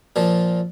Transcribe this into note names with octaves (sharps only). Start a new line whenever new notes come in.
A#2 F3